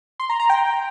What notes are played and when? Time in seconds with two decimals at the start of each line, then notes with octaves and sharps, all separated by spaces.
0.20 C6
0.30 A#5
0.40 A#5
0.50 G5